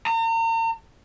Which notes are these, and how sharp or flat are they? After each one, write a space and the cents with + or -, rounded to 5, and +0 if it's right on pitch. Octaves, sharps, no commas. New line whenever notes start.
A#5 -40